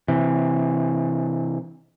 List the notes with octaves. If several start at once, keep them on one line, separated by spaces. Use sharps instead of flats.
C3 E3